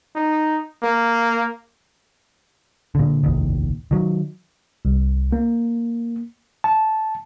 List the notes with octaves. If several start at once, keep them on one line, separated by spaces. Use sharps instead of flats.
D#4
A#3
A#2 D3
F1 A#1 D#2
D#3 F#3
C2
A#3
A5